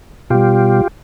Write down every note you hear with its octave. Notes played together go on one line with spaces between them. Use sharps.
B2 G3 F4 G4